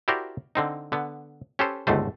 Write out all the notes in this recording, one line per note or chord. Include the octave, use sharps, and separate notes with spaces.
E4 F#4 G4 A#4 C5 D5
D3 C4 D#4
D3 B3
C#4 G4 A4 B4 C5
G1 C#2 G#2 D3 A3 C5